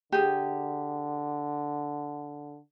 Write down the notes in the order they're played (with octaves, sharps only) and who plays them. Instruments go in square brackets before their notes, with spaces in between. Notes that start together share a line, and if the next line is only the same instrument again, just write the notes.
[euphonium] D3 [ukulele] G4 G#4